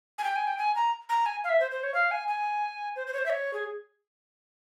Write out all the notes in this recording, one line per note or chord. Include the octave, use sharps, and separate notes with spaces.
G#5
G5
G#5
G5
G#5
A#5
A#5
G#5
F5
E5
C5
C5
C#5
F5
G#5
G#5
C5
C5
C#5
C5
E5
C#5
G#4